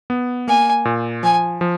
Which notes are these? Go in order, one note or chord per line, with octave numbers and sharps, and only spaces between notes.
B3
A#3 G#5
A#2
F3 G#5
F3